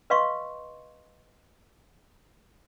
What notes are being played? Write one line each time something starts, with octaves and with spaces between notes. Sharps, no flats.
B4 D#5 F5 C6 C#6